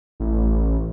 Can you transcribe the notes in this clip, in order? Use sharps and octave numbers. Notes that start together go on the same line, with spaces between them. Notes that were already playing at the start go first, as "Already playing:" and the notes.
A1